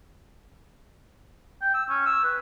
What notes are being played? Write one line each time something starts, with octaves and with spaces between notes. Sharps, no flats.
G5
E6
C#4
E6
B4